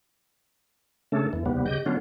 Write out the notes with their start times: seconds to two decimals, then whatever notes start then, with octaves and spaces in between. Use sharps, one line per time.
1.12 C#3 A3 C#4 D4 A4
1.33 E2 E3
1.46 D#2 C3 G3 B3
1.66 C#3 G4 D#5 G6
1.86 D3 F#3 B3 C#4 D4 F4